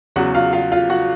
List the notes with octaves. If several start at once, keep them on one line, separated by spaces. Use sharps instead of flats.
E2 C#3 F#3 F#4 F#5
F4 F5
F4 F5
F4 F5
F#4 F#5